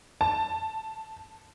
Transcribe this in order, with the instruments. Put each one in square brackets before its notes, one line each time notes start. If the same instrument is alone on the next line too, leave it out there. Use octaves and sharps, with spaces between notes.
[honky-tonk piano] A5